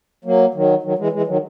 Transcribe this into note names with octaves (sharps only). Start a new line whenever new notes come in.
F#3 A#3
D#3 F#3
D#3 F#3
E3 G#3
E3 G#3
D#3 F#3